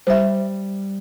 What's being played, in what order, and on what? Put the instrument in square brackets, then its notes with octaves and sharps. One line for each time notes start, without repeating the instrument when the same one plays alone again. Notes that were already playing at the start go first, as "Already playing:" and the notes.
[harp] G3 [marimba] C5 E5